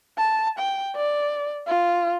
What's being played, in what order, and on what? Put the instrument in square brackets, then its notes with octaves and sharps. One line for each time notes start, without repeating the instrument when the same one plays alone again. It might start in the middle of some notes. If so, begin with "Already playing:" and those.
[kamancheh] A5
G5
D5
F4